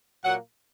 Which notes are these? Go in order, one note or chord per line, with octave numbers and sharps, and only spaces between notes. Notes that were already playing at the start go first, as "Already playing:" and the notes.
A#2 F#3 A#3 F#5